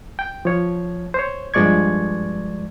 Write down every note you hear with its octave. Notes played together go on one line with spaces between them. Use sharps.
G5
F3 C#5
C5 C#5
G2 F3 G#3 D5 C#6 G#6